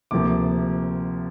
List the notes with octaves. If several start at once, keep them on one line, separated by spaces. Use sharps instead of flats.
D2 C3 F3 A#3 D6